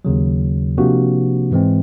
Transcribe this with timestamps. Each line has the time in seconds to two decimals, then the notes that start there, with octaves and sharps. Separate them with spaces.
0.05 D#2 C#3 F#3
0.78 C3 F3 A#3 D4 F#4
1.51 G#2 E3 G#3 C4